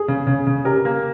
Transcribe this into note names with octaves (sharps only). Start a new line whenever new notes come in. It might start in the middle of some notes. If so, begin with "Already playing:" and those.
Already playing: G#4
C#3
C#3
C#3
G4 A#4
A#3